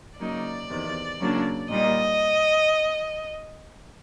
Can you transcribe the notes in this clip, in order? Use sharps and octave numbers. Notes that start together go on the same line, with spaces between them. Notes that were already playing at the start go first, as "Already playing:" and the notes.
C#3 F#3 A#3 D#4 D5
E2 C3 D#3
C#3 F#3 A#3 D4
A#2 G3 A#3 D#4 D#5